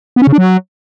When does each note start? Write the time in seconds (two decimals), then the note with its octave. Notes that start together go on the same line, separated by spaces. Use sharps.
0.16 B3
0.22 C#4
0.27 C#3
0.32 D4
0.38 F#3